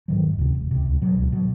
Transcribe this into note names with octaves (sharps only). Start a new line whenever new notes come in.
G#2 D#3 F#3
E1
D2 C3
E1
D2 C3
C#2
B2 F#3
C#2
B2 F#3